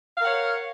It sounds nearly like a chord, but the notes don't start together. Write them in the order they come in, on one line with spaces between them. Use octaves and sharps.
F5 A#4 F#5 C#5